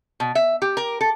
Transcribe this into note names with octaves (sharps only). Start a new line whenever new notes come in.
B2
E5
G4
A#4
A4